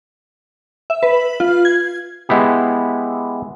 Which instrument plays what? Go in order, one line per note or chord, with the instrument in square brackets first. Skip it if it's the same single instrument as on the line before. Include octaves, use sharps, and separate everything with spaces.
[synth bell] E5
B4
F4
G#6
[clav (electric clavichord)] G#3 B3 E4 G4